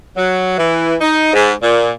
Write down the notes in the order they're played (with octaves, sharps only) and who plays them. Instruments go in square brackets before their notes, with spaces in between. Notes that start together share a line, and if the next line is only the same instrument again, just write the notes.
[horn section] F#3
E3
D#4
G#2
A#2